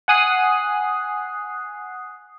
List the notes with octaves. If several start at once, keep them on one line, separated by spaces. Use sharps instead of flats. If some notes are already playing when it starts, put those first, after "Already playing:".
F#5 G#5 D#6 F#6 C7